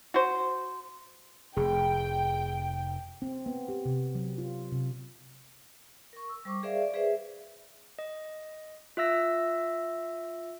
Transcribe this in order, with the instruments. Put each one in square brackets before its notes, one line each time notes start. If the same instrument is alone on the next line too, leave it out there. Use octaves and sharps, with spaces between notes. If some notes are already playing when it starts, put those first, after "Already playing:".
[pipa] F#4 C5
[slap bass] F1 [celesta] G#4 [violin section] G5
[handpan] C4
B3
G4
C3
F#3
F4
C3
[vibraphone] A#4 C#6
E6
G3 C5 C#6 D6
G#4 A#4 C5 D5 E5 F5
D5
G#4 B4 C5 E5
[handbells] D#5
F4 E5 E6 A#6